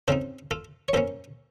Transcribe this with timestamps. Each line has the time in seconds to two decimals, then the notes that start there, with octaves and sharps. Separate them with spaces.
0.08 C#3 F3 C4 D#4 A4 C5
0.51 F4 A4
0.88 C#5
0.93 F#2 F3 A#3 C#4 A4 C5